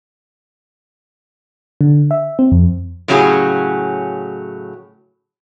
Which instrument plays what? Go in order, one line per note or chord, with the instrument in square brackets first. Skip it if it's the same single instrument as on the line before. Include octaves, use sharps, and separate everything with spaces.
[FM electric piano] D3
E5
C4
F2
[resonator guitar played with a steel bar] A2 C#3 F#3 C#4 G4 G#4